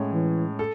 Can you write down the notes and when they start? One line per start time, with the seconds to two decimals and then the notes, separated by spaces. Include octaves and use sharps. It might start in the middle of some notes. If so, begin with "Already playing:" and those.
Already playing: A2 G#3 C#4
0.12 E3
0.59 A4